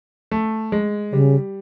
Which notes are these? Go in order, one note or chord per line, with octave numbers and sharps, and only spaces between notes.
A3
G#3
C#3 G3